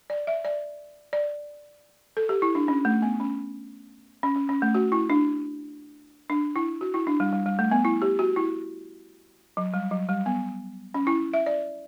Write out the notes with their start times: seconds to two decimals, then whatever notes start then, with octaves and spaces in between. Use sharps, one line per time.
0.10 D5
0.27 E5
0.45 D5
1.13 D5
2.17 A4
2.29 G4
2.42 E4
2.55 D4
2.68 C#4
2.85 A3
3.02 B3
3.20 C#4
4.23 C#4
4.36 C#4
4.49 C#4
4.62 A3
4.74 F#4
4.92 E4
5.10 D4
6.30 D4
6.56 E4
6.81 F#4
6.94 E4
7.07 D4
7.20 G3
7.33 G3
7.46 G3
7.59 A3
7.71 B3
7.85 E4
8.02 G4
8.19 F#4
8.36 E4
9.57 F#3
9.74 G3
9.91 F#3
10.09 G3
10.26 B3
10.94 C#4
11.07 E4
11.34 E5
11.46 D5